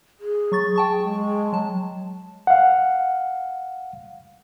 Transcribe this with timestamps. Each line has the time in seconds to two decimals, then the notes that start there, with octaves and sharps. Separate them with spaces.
0.20 G#4
0.52 F#3 C#6 A6
0.76 G5 A5 C#6
1.03 G#3
1.53 F#3 A5
2.47 F5 F#5